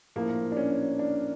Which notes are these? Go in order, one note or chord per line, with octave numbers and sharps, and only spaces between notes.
A#1 A2 F3 A#3
D4
C#4
D4